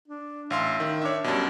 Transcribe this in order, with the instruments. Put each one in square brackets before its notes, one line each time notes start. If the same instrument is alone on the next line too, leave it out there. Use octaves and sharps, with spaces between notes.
[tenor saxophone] D4
[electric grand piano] A1 F5 C6 [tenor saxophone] E5
[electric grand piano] D#3
[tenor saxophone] D4 [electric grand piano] C#5 E5
[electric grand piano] F#2 B2 [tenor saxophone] G3